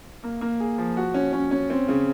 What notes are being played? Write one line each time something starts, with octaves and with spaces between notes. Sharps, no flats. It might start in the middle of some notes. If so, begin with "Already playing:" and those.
A#3
A#3
G#4
F3
F#4
C#4
C#4
C#4
C4
C#3